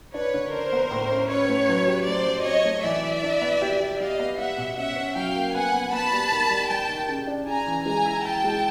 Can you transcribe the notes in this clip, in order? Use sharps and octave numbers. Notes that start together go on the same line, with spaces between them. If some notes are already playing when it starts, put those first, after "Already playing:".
D4 B4 C#5
D3
D4 A#4 C5
B3
A2
C#4
C#4 B4 C#5
A3
F#3
G4
A3 C5 D5
F#3
C4 C#5 D#5
A3
E3 D5 E5
E4
D4
B3
G4
G4
G3 D#5 F5
B3
G3 E5 F#5
B2
C#4 E5 F#5
C#4
F#3 F5 G5
A#3
B3 F#5 G#5
B3
B3 A5 B5
G3
D#3
G3
G3 G5 A5
D#3
C#3
D4
C#3 G#5 A#5
E3
G#3 G#5 A#5
E4
E4 G5 A5
G#3